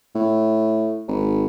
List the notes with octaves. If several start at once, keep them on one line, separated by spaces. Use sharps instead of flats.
A2
G#1